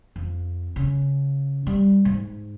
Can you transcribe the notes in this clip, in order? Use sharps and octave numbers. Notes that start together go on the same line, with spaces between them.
F2
C#3
G3
G#2